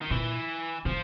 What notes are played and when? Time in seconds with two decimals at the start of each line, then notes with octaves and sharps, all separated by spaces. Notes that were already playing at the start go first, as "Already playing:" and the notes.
0.01 D#3
0.10 A#2 E3
0.85 A2 F3